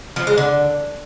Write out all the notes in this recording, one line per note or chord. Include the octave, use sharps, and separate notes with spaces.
F3
G#3
D3